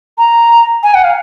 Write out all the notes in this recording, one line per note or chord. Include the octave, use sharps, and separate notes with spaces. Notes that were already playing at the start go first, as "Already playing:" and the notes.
A#5
G#5
F#5
F5